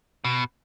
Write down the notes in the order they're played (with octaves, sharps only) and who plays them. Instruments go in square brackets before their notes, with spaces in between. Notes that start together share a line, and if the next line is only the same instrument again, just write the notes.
[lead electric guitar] B2